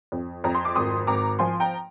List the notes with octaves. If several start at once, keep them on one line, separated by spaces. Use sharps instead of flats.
F2
F2 A#5
C6
D6
G#1 C6 D#6
G#1 A#5 D6
F3 G#5 C6
G5 A#5